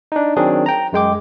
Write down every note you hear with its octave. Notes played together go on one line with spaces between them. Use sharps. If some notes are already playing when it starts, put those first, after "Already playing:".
D4 D#4
D#3 F#3 C4 D4 G#4
G5 A#5
F#2 G#3 G5 D6